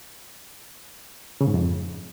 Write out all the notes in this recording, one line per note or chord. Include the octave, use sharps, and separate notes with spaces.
C#3
G#2
F2